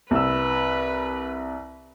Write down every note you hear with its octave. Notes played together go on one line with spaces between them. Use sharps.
C2 B4 E6